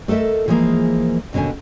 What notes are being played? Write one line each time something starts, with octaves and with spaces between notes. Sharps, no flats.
A3 A4 A#4 D#5 E5
E3 F3 G#3 A#3 G#4 A#4
D#2 B2 D3 C#4 G#5